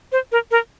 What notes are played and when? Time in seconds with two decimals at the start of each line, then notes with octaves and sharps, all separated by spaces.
0.12 C5
0.32 A#4
0.51 A#4